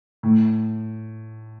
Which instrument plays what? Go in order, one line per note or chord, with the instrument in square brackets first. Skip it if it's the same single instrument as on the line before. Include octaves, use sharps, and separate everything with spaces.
[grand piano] A2